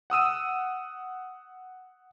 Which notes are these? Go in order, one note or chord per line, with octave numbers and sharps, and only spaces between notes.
F#5 D#6 E6 D#7